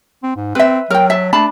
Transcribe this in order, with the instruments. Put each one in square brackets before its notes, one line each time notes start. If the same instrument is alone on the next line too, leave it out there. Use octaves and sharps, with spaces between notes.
[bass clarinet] C4
G#2
[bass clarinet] C4 [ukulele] B4 E5
[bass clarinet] F#3 [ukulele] A#4 G5
[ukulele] E5 A5
[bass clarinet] A3 [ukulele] D4 A5 B5